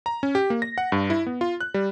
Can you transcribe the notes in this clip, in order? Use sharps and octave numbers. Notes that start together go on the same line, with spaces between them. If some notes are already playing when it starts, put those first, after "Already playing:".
A#5
C#4
G4
A#3
A#6
F#5
G2
E4
B3
F4
F#6
G3